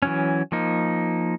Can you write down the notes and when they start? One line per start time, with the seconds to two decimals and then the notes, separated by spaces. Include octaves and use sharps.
0.02 E3 F#3 C#4
0.52 F3 A#3 D#4